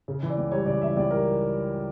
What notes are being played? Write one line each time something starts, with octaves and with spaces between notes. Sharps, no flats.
C#3
E3
D5
C#2
G3 C#5
C#3 D5
E3 E5
C#2 D5
G3 A#4